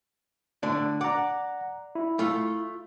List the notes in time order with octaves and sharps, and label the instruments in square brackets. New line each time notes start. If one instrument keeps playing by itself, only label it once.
[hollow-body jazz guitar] A2 D3 D4
[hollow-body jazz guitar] D5 [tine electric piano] F#5 A#5
[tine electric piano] E4
[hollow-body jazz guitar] A3 F4